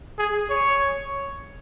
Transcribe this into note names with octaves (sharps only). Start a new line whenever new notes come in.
G#4
C#5